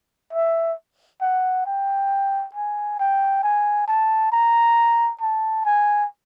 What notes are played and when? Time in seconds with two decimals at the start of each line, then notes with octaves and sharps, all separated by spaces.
0.33 E5
1.21 F#5
1.66 G5
2.55 G#5
2.99 G5
3.43 G#5
3.88 A5
4.32 A#5
5.21 A5
5.65 G#5